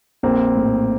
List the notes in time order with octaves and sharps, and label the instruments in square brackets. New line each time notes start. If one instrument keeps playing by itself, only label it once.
[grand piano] A#1 A#3 C4
A2